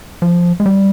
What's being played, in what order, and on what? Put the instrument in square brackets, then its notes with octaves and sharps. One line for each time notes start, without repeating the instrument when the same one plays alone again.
[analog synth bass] F3
G#3
G3